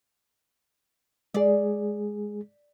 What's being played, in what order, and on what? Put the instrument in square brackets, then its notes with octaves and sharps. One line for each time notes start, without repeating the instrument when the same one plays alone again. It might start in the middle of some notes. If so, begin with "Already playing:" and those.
[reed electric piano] G#3 G#4 [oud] D5